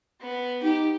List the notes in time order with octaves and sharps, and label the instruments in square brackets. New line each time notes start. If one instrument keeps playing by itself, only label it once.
[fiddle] B3
[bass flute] D#4 [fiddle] G4